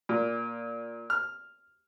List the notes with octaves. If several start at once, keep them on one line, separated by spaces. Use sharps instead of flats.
A#2
F6